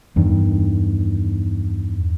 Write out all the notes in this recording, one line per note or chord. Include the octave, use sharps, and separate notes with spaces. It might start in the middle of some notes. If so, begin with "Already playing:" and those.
E2 G2 D#3